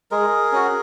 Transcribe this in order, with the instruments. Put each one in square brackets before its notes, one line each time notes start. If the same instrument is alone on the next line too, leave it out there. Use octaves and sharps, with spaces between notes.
[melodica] G#3 G#4 A#4
C#4 F#4